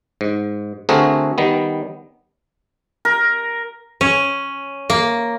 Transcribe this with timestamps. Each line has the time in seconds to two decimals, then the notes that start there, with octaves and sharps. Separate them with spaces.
0.21 G#2
0.89 D3 A3 C4 F#4 G#4 A#4
1.38 D#3 G3 B3
3.05 A#4
4.01 C#4
4.90 A#3